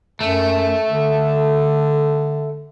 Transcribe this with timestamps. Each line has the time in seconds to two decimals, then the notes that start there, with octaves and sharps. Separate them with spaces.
0.20 F#2 A3
0.90 D3